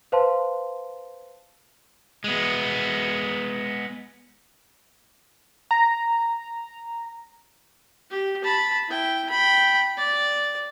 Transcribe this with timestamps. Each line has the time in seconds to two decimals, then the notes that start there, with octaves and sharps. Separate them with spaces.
0.12 B4 C5 F5 A5 C6
2.24 G#3 B3
5.71 A#5
8.11 G4
8.44 A5 B5
8.89 E4 G5
9.30 G5 B5
9.97 D5